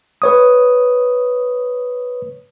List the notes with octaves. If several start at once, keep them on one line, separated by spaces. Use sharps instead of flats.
B4 C#5 D#6